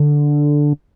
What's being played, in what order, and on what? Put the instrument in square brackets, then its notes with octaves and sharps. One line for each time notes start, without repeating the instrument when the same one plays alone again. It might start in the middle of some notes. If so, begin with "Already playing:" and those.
Already playing: [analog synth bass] D3